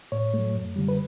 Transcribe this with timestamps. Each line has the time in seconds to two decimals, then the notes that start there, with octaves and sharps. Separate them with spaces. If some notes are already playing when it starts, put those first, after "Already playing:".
0.12 A2 C#5
0.34 F#3 A3
0.54 F#2
0.76 D3 G3
0.88 B4